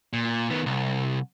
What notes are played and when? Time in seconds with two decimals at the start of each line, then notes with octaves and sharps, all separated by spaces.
0.13 A#2
0.50 D#3 B3
0.66 C2